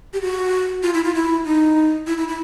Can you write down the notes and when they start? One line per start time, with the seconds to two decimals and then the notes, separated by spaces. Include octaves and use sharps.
0.13 G4
0.22 F#4
0.83 F4
0.94 E4
1.04 F4
1.15 E4
1.45 D#4
2.07 E4
2.18 E4
2.28 E4